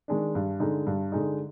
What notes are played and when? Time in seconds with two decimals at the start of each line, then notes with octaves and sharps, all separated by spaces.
0.08 D#3 G#3 D4
0.35 G2
0.60 D3 G#3 D#4
0.86 G2
1.12 D3 G#3 D#4